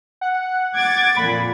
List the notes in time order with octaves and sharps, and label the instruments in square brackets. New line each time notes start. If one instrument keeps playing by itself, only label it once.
[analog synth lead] F#5
[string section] D6 G#6 A6
[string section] F2 A#2 [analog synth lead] B5